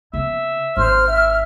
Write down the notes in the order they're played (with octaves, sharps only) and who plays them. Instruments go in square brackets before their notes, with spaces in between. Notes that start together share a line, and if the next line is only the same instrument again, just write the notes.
[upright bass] C#3 B3 [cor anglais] E5
[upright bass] G#1 E3 [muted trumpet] C5 [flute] F6
[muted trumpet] E5